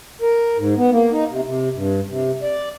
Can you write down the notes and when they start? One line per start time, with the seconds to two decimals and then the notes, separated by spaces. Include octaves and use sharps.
0.22 A#4
0.58 G#2
0.77 B3
0.92 A#3
1.12 D#4
1.30 C3
1.46 C3
1.75 G2
2.09 C3
2.43 D5